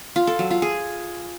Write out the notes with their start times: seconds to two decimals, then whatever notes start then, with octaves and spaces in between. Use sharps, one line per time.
0.16 F4
0.27 A4
0.39 F#3
0.51 F4
0.62 G#4